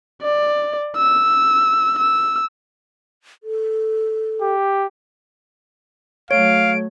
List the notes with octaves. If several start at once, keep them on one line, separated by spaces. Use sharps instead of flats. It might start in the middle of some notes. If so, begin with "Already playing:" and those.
D5
E6
E6
A4
G4
F#3 A3 C#5 F5 D7